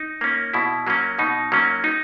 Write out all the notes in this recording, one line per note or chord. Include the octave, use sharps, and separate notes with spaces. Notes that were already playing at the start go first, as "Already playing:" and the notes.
Already playing: D#4
A#3 C#4
B2 E4
F#3 A#3 C#4
B2 D#4
F#3 A#3 C#4
D#4